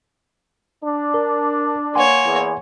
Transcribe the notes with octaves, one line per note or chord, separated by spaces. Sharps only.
D4
A#4
A#3 C#5 F#5 G#5 C6
E2